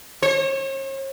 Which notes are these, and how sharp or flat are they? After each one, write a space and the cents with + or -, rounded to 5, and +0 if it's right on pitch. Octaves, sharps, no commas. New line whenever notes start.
C#5 -45